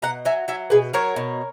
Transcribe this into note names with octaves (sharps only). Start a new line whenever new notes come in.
B2 F#5 A#5
F#3 E5 G#5
F#3 E5 G#5
B2 G#4 B4
F#3 A#4 C#5
B2